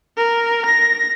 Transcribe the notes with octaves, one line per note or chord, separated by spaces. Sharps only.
A#4
A#6